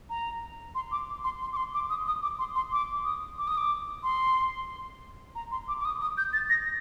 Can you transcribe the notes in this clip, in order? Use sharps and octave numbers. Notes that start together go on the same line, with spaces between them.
A#5
C6
D6
C6
C6
D6
C6
D6
D#6
D#6
D6
C6
C6
D6
D#6
D6
D#6
D6
C6
A#5
C6
D6
D6
D#6
D#6
G6
A6
A#6